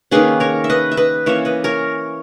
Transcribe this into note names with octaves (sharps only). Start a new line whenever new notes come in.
D#3 A#3 C#4 G#4 B4
A#4 C#5
E5
B4 D#5
E5
B4 D#5
E3 A#3 C#4 C#5 E5
B4 D#5
A#4 C#5